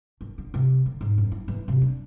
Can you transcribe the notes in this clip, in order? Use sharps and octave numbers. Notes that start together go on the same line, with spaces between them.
D#3
D3
C3
D3
G#2
F#2
E4
E3
C3
D4